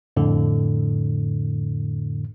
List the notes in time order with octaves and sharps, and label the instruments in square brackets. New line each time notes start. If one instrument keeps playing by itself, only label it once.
[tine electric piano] F2 A2 D3